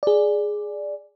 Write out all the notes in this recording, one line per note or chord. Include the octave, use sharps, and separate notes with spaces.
G#4 D5